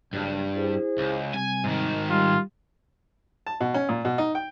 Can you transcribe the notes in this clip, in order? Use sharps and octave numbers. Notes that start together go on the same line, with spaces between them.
F#1 G2
E4 G#4 C5
C#2
C3 G3 G#5
G#2 D#3
G3 F4
A5
B2
C#4
A#2
B2
D#4
G5